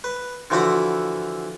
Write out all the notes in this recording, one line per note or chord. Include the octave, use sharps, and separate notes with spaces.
B4
D3 E3 F3 F#4 F#5 B5